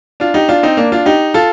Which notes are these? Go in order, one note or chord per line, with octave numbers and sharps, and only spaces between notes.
D4 F4
D#4 G4
D4 F4
C4 D#4
A#3 D4
D4 F4
D#4 G4
F4 A4